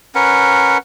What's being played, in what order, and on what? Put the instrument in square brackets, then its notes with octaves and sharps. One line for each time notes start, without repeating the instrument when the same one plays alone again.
[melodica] C#4 A#4 B4 F#5